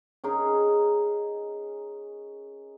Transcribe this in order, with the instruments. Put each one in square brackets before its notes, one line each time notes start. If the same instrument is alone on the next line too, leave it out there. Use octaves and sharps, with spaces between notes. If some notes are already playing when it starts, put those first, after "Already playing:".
[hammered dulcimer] C#4 D#4 G#4 A#4